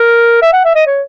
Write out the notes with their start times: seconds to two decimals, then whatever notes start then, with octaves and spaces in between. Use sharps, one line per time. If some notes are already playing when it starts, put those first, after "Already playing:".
Already playing: A#4
0.42 E5
0.53 F#5
0.65 E5
0.75 D#5
0.86 C#5